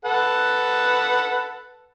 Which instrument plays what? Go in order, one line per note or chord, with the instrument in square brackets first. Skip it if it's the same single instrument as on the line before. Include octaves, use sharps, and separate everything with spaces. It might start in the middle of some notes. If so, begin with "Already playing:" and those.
[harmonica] A4 B4 F#5